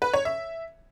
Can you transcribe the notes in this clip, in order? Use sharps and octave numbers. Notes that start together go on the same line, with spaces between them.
B4
C#5
E5